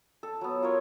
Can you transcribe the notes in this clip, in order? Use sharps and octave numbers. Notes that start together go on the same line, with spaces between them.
A4
F#3 B3
F4 A#4 C#5